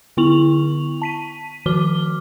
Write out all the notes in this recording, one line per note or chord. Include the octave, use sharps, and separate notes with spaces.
D3 B3 E4 C#6 F7 F#7
A5 B6 D#7
D#3 F3 F#4 D6 F6 G7